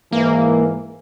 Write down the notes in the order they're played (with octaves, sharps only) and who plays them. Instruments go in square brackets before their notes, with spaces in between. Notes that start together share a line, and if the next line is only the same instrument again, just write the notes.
[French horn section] G#2 E3 [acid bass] A#3